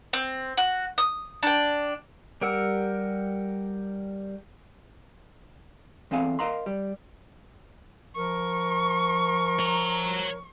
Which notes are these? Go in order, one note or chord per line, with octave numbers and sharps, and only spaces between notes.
C4
F#4
D#6
D4 G5
G3 G4 A#4 F#5 E6
E2 C4 A4 F5 G#5
A#4 D#5 F5 A#5 C6
G3
F3 A#4 C#6
C#5 A#5